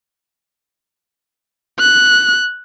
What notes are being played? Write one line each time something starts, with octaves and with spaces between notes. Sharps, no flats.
F#6